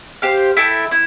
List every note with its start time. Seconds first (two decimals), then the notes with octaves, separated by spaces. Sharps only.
0.22 G4 C5 F5
0.57 E4 A4 E5 G5
0.91 E4